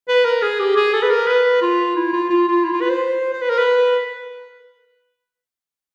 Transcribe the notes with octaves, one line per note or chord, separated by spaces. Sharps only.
B4
A#4
G#4
G4
G#4
A4
B4
A#4
B4
F4
E4
F4
F4
F4
E4
F4
B4
C5
C5
B4
A#4
B4